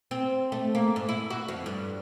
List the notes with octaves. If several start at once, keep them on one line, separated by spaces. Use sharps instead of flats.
C4
A3
A#3
G#2
E4
F#4
F2
G2